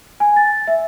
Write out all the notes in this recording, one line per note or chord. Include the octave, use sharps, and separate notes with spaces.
G#5
A6
E5